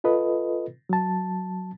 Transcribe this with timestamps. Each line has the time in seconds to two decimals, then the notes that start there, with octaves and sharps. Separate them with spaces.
0.04 F4 A4 B4 D#5
0.89 F#3 A5